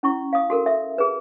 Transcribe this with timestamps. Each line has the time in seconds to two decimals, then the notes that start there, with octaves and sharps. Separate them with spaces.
0.03 C#4 E4 C#6
0.33 F5 D#6
0.50 F#4 A4 A#4
0.66 E5
0.98 G#4 B4